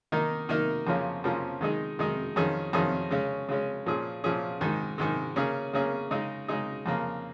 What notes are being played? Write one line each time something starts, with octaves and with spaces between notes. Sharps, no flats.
D#3 A#3 D#4 A#4
D#3 A#3 D#4 A#4
F2 C#3 F3 A#3 C#4
F2 C#3 F3 A#3 C#4
D#3 G#3 D#4 G#4
D#3 G#3 D#4 G#4
F2 D#3 C#4 G#4
F2 D#3 C#4 G#4
C#3 G#3 C#4
C#3 G#3 C#4
A#2 F3 C#4 G#4
A#2 F3 C#4 G#4
G#2 D#3 G#3
G#2 D#3 G#3
C#3 A#3 C#4 G#4
C#3 A#3 C#4 G#4
C#3 G#3 D#4 G#4
C#3 G#3 D#4 G#4
F2 C#3 A#3